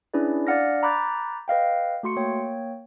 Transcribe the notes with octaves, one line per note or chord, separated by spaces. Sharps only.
C#4 D4 E4 G#4 B4 D5
D4 D5 F5 F#5 F6 A#6
A#5 B5 D6 F#6 G6 A6
B4 D#5 F5 G5
A3 F#4 C6 C#7
A#3 C#5 G5